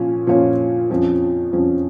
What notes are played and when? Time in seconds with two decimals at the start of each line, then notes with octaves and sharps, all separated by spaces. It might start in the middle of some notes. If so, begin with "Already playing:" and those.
Already playing: A#2 F3 C#4 F4
0.27 A#2 F3 C#4 F4 C#5
0.90 F2 F3 C#4
1.52 F2 F3 C#4